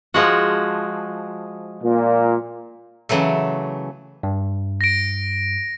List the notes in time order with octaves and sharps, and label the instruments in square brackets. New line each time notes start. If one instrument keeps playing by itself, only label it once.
[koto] F3 G#3 F#4
[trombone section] A#2
[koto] C#3 E3 F#3 A3
[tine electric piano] G2
[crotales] A#6 D7